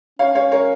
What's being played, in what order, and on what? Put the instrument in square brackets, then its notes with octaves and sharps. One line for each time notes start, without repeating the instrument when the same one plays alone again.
[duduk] C#4 [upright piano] C#5 F5
[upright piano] C#5 F5
A#4 C#5